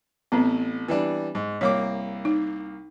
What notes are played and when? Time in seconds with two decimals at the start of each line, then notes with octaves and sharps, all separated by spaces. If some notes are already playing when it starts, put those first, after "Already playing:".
0.32 A1 B3 C4
0.88 E3 G3 D4
1.35 G#2
1.61 C2 A#3 C#5 D6
2.25 D#4